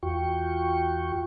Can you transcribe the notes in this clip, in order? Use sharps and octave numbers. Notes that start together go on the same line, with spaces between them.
E2 F4 F#4 G5 C#6